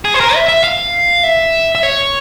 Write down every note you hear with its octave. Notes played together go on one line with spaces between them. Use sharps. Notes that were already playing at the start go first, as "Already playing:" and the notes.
G#4
C5
A#4
E5
E5
F5
E5
E5
C#5